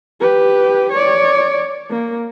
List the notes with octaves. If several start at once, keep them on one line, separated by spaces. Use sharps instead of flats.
G4 B4
C#5 D5
A#3